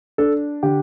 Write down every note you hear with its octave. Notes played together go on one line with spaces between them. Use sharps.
D4 A4
D3 G4